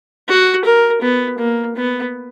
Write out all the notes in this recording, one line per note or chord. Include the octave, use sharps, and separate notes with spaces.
F#4
A#4
B3
A#3
B3